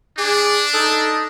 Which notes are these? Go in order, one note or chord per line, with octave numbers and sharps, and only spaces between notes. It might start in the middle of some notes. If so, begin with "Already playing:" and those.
D4 G#4 D6
D#4 A4